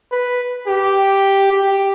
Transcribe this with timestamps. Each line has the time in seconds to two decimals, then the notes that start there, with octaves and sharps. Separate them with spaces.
0.11 B4
0.67 G4
1.52 G4